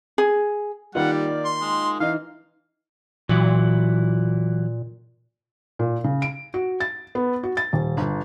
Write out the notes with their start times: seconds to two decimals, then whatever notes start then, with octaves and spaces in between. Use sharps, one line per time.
0.18 G#4
0.95 D#3 G3 A#3 F4 F#5
1.13 D5
1.45 C6
1.61 G#3
2.00 E3 D#4 F5
3.29 A#2 E3 F#3 E4
5.79 A#2
6.04 C#3
6.22 D7
6.54 F#4
6.80 A6
7.15 B3
7.43 F#4
7.57 A6
7.73 D#1
7.97 G1